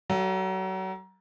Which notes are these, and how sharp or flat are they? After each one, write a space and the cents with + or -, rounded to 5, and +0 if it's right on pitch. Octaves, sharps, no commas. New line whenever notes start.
F#3 +35 A4 +20 F5 -15